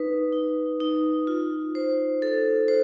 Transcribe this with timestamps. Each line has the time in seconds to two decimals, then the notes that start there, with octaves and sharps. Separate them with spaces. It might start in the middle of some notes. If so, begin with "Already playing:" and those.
Already playing: D#4 B4
0.33 D#4
0.80 D#4
1.27 F4
1.75 C5
2.22 A4
2.68 C5